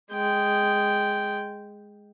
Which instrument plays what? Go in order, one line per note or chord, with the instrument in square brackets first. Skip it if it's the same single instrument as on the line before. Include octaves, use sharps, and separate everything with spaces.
[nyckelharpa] G#3 G5